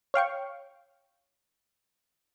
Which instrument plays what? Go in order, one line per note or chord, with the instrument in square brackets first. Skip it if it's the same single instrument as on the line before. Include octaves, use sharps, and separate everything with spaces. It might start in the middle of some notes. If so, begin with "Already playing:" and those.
[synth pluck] C#5 F5 G5 C#6